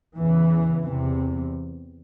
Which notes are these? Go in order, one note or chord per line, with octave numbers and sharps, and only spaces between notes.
E2 C#3 E3
E2 C3